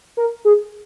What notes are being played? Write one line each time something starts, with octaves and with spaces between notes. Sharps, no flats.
A#4
G#4